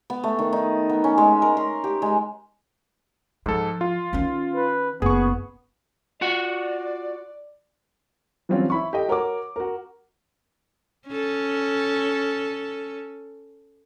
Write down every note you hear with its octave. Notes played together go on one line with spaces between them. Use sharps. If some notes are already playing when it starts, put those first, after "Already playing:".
B3
A3
D#3
D#4
B3
C#4
G#3
A#4
C6
G4
G#3
G#2 F3 A4
F4
D#3 C#4
B4
F#1 B3 G#4 C#6
F4 F#4 D5 F#5
E3 F#3 G3 C4 C#4 F4
E4 B5 C#6
G4 A4 D#5 G5
F#4 A#4 C#5 F#5 D6
F#4 A#4
C#4 A4